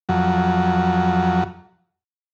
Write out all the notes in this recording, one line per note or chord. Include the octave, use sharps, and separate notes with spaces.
F2 F#3